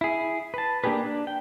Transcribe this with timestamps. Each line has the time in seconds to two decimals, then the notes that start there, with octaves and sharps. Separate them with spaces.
0.01 E4 G#4
0.54 B4 A5
0.84 A#3 D4 G4 G#4 B4
1.04 D4
1.27 G5